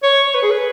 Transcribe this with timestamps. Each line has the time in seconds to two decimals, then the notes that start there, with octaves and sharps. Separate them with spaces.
0.03 C#5
0.26 C#5
0.34 B4
0.43 G#4
0.51 B4